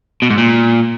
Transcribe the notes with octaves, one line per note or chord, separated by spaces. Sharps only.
B2
G#2
A#2